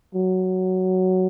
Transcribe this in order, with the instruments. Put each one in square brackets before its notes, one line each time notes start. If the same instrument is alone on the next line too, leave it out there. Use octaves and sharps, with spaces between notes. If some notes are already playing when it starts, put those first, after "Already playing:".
[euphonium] F#3